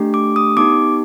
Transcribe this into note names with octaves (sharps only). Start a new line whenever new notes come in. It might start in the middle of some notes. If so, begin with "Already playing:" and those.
Already playing: A3 D4 G4
D6
D#6
B3 D#4 G4 D6